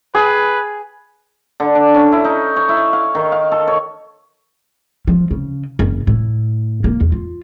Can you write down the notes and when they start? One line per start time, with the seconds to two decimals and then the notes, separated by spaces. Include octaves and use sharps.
0.15 G#4 B4
1.60 D3
1.75 D4
1.94 C#4
2.12 E4
2.24 D#4
2.56 C#5
2.69 E4
2.93 F5
3.15 D#3
3.32 F5
3.52 A4
3.67 C#5
5.07 F3
5.31 C#3
5.79 F#1
6.07 A2
6.84 A#3
7.01 E2
7.12 F4